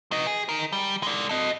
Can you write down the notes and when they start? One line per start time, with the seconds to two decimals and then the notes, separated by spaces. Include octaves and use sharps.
0.11 F#3 D#5
0.27 G#4
0.49 D#4 A#4
0.72 G3
1.03 G#3 D5
1.29 A4 D#5